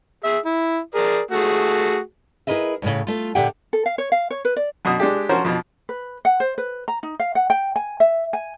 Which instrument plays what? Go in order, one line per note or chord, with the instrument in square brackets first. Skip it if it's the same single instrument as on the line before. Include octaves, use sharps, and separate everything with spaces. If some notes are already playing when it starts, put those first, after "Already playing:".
[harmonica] G#4 E5
E4
G#4 A#4 D5
A3 F#4 G#4
[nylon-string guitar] E4 G#4 A#4 B4 D#5 E5
D2 A2 C#3
A3 F4
A#2 D3 G4 E5 F#5 G5
[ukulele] A4
F5
C#5
F5
C#5
B4
D5
[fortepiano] F#2 B2 F#4 D#6
G#3 D4 G4
F3 C#4 F#4 A#4 C5
F2 B2
[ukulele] B4
F#5
C5
B4
A#5
D#4
F5
F#5
G5
G#5
E5
G#5